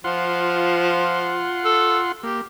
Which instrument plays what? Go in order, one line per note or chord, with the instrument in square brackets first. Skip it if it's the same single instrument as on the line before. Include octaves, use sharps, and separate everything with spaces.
[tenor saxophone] F3 [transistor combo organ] F4 F#5 C6
[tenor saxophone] A4
[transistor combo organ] A#3 [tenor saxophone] G4